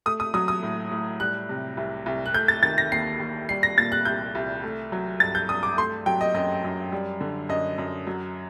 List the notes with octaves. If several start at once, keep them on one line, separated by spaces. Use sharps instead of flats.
A3 D#6
D#6
F#3 D#6
D#6
A2
A2
G3 F#6
C3
C2
C2
F#6
A3 G6
A6
D#3 A6
A#6
D#2 C7
D#2
G3 C7
A#6
A#2 A6
F#6
C2 G6
C2
A3
F#3
G2 A6
G6
G2 D#6
D6
A3 C6
F#3 G5
D#5
F#2 D#5
F#2
G3
D3
F#2 D#5
F#2
F#3